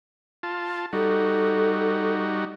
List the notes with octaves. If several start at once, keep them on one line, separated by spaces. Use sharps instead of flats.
F4 A5
G3 D#4 F#4 A4